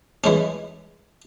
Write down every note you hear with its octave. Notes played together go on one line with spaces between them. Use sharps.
E3 G#3 C#4